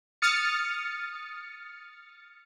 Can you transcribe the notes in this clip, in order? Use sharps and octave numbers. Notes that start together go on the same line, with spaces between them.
D#6 F6 A6 C#7